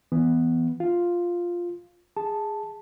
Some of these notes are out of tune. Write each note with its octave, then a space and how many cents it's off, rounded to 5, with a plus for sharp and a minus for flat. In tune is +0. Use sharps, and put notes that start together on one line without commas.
E3 +5 B3 +0
F4 +0 F5 +0
G#4 -10 A5 +0